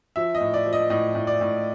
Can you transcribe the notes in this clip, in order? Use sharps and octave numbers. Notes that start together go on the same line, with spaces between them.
F3 E5
D#5
A2
D5
F3
D#5
A2 D#5
A2
D5
A2